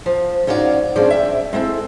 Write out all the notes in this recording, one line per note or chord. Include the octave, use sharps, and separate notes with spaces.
F3
G#2 C#4 F4 F#4 A4 D5
G2 F3 C4 C#4 G#4 D5
E5 G5
G#3 C4 E4 A4